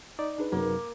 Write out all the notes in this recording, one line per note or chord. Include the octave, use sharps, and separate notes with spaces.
D#4 D5
D4 D#4 G#4 B4
F#2 C3 F#3 A#3